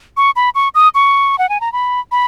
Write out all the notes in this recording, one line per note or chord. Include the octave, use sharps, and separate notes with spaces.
C#6
B5
C#6
D#6
C#6
F#5
G#5
A#5
B5
B5